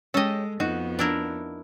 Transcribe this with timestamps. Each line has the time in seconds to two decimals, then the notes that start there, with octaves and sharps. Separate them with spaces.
0.14 G#3 C#4 G4 A4 D#5
0.60 F2 B3 D#4 F#4
0.99 D4 E4 A#4